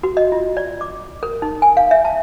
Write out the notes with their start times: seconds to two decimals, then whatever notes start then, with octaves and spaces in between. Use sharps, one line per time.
0.03 F#4
0.17 D#5
0.32 F4
0.57 D5
0.81 D6
1.23 A#4
1.42 D#4
1.62 G#5
1.77 F5
1.91 E5
2.05 A5